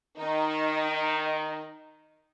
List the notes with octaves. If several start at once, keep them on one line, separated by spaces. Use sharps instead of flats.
D#3 D#4